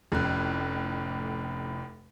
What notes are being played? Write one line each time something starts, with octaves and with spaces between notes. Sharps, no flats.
F1 F2 A2 C#4 F#6